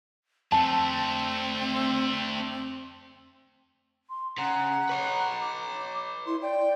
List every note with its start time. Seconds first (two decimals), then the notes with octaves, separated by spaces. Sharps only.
0.52 F2 A3 C4 D4 A5
4.10 C6
4.38 C#3 F#5 A#5
4.89 B4 C#5
5.41 D6
6.26 E4 C6
6.42 D5 G5